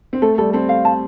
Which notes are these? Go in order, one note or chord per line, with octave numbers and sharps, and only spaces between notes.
C4
A3 A4
G3 A4
C4 A4
F5
A5